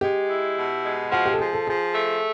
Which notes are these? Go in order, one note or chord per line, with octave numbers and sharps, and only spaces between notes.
G#3 G4
E4
B2
G#3
F3 F#4
G4
A4
F3 G#4
A4
F3 G#4
A3